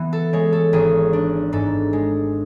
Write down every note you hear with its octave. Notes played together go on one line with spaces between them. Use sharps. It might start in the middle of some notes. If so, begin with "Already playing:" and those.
Already playing: E3 B3 E5
A4
G#3 C#5
A4
G#1 G#4
D4
G#2 A4
G#3